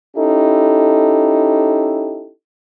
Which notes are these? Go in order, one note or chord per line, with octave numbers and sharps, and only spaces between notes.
C#4 D#4 E4 G4 A4